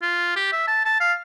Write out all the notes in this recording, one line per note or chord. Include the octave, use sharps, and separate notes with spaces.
F4
G4
E5
A5
A5
F5